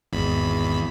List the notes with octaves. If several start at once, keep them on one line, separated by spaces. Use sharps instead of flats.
G#1 E2 B5